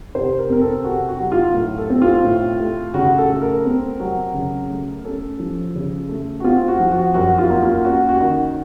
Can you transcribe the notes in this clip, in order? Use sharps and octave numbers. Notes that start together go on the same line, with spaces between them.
C3 C5
A#4
C4 A#4
A4
C3 F#4
F#4
F#3
F4
A2
A4
C4
F4
A2
A3
C#3 F#4
A4
A3
A#4
C4
F#3
C#3
A3
C#4 A4
F3
C#3
A3
F#4
C4 F4
F#4
F3
F#4
F#2 F#4
F4
A#3
F4
C#4 F#4
F#4
D#3